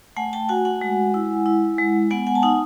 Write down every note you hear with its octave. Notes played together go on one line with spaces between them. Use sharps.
A3 F#5 G#5
G5 A5
F#4 F#5 G#5
F#5 G#5
G#3
E4
E4
G#3
B3 F#5 G#5
F#5 G#5
A5
D#4 F#5 G#5